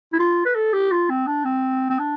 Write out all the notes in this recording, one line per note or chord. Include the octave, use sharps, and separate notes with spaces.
E4
F4
B4
A4
G4
F4
C4
D4
C4
C4
D4